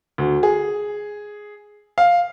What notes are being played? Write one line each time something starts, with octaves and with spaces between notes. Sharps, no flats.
D2
G#4
F5